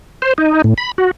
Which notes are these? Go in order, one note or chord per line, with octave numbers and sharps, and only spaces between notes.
C5
D#4
A2
B5
F#4